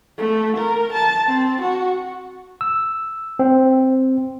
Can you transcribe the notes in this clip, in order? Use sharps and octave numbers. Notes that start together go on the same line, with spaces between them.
A3
A#4
A5
C4
F#4
E6
C4